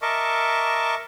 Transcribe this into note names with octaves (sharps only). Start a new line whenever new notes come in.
A#4 D#5 E5 A5 C#6 D6